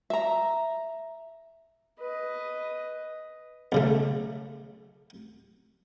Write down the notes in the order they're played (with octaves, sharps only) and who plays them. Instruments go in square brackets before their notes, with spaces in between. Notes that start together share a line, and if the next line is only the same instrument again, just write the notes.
[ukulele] E5 A#5
[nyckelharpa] B4 D#5
[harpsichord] B1 C#3 A3